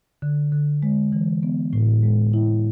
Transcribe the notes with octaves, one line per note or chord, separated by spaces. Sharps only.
D3
D3
G#3
E3
B3
A2
G#3
E4